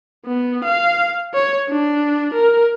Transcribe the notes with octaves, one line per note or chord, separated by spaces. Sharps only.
B3
F5
C#5
D4
A#4